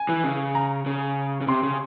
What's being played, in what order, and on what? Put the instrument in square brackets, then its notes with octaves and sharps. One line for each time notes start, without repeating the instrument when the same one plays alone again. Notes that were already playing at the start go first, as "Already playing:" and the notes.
Already playing: [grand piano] G#5
[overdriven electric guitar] E3
C#3
[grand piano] A#5
[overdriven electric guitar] C#3
C#3
[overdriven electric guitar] C3 [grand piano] C6
[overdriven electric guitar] C#3